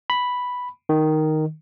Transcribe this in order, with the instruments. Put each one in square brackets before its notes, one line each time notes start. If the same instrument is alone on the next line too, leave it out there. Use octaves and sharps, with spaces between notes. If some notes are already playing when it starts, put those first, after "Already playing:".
[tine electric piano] B5
D#3